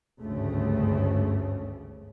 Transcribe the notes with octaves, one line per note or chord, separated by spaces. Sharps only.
G#1 D2 G2 C#3 A3